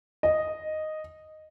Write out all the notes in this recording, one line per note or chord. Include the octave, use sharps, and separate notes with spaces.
D#5